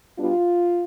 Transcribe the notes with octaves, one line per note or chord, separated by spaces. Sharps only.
B2 G3 B3 D4 F4